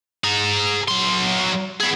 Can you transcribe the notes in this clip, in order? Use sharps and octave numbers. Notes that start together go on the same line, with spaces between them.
G#4 A#5
F#3 C6
B3 G#4